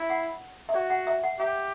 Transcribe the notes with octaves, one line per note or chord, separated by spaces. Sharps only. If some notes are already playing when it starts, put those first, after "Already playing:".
Already playing: E4
F#5
E5
F#4 D5
F#5
E5
F#5
G4 E5